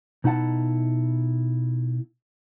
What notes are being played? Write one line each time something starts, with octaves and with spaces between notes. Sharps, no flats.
B2 D#4 E4 F#5 A5